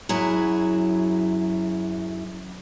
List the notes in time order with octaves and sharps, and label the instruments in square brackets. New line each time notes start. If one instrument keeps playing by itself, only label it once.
[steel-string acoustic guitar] F#2 F#3 E4 G#4